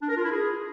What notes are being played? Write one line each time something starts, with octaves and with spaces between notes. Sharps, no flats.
D4
A#4
F4
E4
G#4